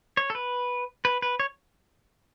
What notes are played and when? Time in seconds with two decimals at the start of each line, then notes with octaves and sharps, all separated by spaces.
0.17 C#5
0.30 A4
0.35 B4
1.05 B4
1.22 B4
1.40 C#5